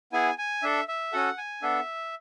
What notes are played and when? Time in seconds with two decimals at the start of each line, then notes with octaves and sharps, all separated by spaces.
0.13 B3 E4 G#4 G#5
0.38 G#5
0.62 D4 A4 E5
0.88 E5
1.12 C#4 F#4 A4 F#5
1.38 G#5
1.62 B3 D4 A4 E5